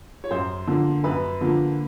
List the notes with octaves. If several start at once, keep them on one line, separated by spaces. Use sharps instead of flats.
C#5
F#2 C5
D3 F3 A#3
F#2 B4
D3 F3 A#3